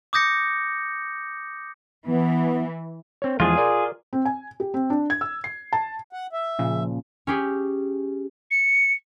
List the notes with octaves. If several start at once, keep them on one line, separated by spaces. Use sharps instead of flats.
D6 D#6 G6 A#6 C#7
E3 B3
C4 C#5
E2 F3 G#3 F4 G#4
A#4 D5
C4
G#5
G4
C4
D4
G#6
E6
C7
A5
F#5
E5
A#2 C#3 F3
C#4 G4 G#4
C#7